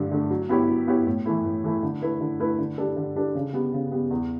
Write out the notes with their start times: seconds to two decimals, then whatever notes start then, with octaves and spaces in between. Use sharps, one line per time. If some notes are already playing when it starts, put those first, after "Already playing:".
Already playing: G2 D3 A3 D4
0.11 D3 A3 D4
0.31 F#3
0.49 B3 E4 G4 C#5
0.68 F#3
0.88 B3 E4 G4 C#5
1.07 A2
1.25 E3 A3 E4
1.45 A2
1.64 E3 A3 E4
1.83 D3
2.02 A3 E4 B4
2.21 D3
2.40 A3 E4 B4
2.59 D3
2.78 G3 D4 A4
2.97 D3
3.16 G3 D4 A4
3.35 C#3
3.53 G3 B3
3.73 C#3
3.92 G3 B3
4.11 E2